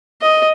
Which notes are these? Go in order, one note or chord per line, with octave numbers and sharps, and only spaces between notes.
D#5